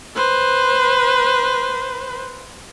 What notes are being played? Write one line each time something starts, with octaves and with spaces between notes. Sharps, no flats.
B4 C5